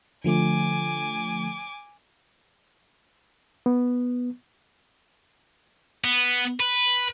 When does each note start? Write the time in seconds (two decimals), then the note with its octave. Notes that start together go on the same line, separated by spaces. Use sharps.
0.24 D3 F3 A3 G#5 D6
3.66 B3
6.04 B3
6.60 B4